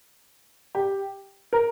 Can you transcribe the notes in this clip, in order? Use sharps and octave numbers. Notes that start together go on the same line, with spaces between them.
G4
A#4